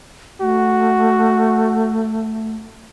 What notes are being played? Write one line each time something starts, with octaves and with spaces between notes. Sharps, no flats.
A3 F#4